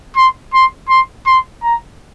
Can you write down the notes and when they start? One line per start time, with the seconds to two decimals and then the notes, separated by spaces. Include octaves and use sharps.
0.16 C6
0.53 C6
0.89 C6
1.26 C6
1.63 A#5